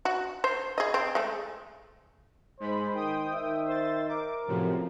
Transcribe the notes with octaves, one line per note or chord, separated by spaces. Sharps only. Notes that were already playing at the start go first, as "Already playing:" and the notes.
F#4
C5
G#4 D#5
C4
G#3 A3
G#2 G#3 C5 B5
D#3 G5 D#6
D#3 E5
C5 A6
A#4 D6
F#2 A2 C3 F3